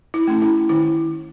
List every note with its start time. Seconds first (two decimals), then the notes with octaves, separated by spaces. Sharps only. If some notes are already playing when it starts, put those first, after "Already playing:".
0.14 E4
0.27 A3 C#4
0.42 E4
0.69 D#3 E4